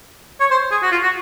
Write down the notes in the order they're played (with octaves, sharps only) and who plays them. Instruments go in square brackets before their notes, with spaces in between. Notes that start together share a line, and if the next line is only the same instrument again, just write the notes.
[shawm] C#5
C5
G#4
F#4
F4
F#4